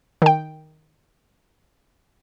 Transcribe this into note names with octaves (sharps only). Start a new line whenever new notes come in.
D#3 G5